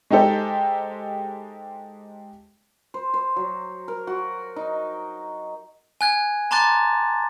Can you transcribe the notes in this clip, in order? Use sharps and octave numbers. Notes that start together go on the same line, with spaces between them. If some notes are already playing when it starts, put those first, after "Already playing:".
G#3 D#4 G4 A4 C5
C5
C5
F#3
A#4
F#4
D#4
G#5 F#6 G#6
A5 A#5 C6 D6 F#6 A6